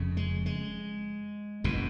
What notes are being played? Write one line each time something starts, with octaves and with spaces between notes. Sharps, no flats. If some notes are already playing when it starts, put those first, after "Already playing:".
Already playing: F1 F2 C#3
G#3
G#3
F#1 E2 B2